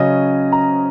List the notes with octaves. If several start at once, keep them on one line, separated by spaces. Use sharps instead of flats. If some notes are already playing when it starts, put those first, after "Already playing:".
Already playing: C#3 F#3 C#4 D#5
A#5